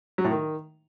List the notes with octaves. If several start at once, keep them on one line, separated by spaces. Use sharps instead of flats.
F#3
A2
D#3